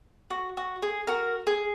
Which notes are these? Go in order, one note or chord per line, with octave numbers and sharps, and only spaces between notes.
F#4
F#4
G#4
F#4 A#4
G#4